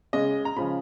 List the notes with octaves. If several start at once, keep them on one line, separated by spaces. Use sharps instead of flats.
C#3 G#3 D#5
A#5
C#3 F3 G#3 B5